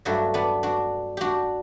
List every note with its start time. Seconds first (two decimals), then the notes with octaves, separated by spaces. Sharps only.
0.05 G2 F#3 A3 D4 F#4
0.34 B3 D4
0.63 D4 F#4
1.17 D4 F#4 G4